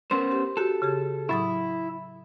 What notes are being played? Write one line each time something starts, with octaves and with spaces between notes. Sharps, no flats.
B3 C#4 A#4 C5 C6
G4
F#4 G4 A4
C#3 G4 G#4
A2 F#3 E4 D#6